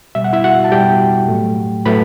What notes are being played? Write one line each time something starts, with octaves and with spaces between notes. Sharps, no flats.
B2 G3 E5
F#5
E4 E5
F#4 F#5
A5
B2 G3 G4 G5
A2 F#3 A3
A2 F#3 A3 B4 B5